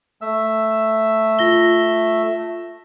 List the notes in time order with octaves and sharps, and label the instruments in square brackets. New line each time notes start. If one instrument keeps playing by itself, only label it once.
[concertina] A3 E5 E6
[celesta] F4 A#6 G7